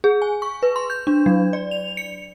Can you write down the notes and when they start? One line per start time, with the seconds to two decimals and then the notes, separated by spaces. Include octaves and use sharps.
0.04 G#4
0.22 G#5
0.42 C#6
0.63 B4
0.76 C6
0.90 G6
1.07 D4
1.26 F#3
1.53 D5
1.71 F7
1.97 C#7